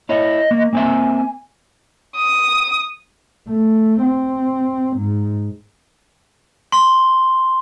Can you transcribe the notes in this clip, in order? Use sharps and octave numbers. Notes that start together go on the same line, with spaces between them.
E4 C#5 D#5
A#3
A#3 C4 E5 G#5
D#6
A3
C4
G#2
C6